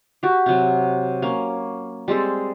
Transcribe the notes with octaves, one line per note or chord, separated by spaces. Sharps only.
F#4 G4
C3 F#3
A#3 C#4
G3 G#3 C4 A4